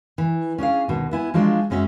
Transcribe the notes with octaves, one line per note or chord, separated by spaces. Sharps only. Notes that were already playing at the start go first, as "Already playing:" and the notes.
E3
C#4 D4 G#4 F5
D2 B2 D#3
B3 E4 G#5
F3 F#3 G#3 D4 F4
F#2 G#3 C#4 F#4 E5